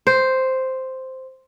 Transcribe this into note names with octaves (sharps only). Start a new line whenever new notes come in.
C5